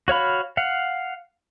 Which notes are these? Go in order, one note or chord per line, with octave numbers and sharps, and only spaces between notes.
F#4 C#5 F5 B5
F5 F#5